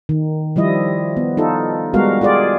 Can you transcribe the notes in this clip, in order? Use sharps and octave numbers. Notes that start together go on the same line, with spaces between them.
D#3
F3 G3 E4 D#5
B3
D#4 F4 A4
G3 G#3 B3 F#4 A#4 F5
F4 G4 G#4 D5